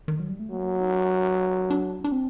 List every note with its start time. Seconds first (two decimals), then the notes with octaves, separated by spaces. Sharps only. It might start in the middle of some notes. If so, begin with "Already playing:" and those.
0.08 D#3
0.19 F#3
0.29 G3
0.39 A3
0.50 F#3 A#3
0.81 D#4
0.90 D4
1.70 D4
2.04 D4
2.12 C4